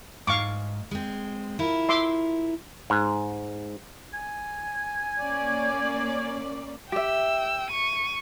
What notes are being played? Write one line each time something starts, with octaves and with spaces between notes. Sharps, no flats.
G#2 F5 C#6 D6
G#3 C4
E4 F4 A#4
E5 C6 D6
G#2
G#5
A#3 C#4 D5
G4 E5 G5 E6
C#6 D#7